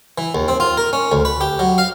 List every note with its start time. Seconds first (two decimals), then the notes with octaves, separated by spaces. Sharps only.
0.18 E3
0.35 D#2
0.48 C4
0.60 F4
0.77 A#4
0.93 C#4
1.12 D2
1.25 B4
1.41 G4
1.59 F#3
1.78 F5